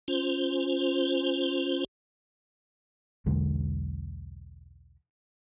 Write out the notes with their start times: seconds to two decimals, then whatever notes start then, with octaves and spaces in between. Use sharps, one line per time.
0.08 C#4 F4 C5
3.26 B1 E2 D3 G#3